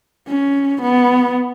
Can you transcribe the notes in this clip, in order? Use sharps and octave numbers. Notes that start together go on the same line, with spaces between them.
C#4
B3